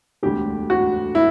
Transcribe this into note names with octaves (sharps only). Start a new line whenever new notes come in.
E1 D2 D3 G4
F#4
E4